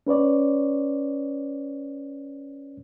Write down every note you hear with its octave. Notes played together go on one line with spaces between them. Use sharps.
C#4 B4 C#5 D5